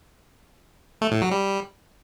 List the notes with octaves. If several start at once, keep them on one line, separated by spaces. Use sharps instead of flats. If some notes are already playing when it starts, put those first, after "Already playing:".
A3
A2
F#3
G3